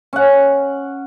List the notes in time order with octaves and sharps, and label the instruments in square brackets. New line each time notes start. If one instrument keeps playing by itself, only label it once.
[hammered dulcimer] C#4 F#5